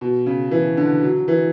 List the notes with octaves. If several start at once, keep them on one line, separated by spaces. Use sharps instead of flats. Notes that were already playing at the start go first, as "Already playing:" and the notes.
B2
C#3
E3
D3
F#3
E3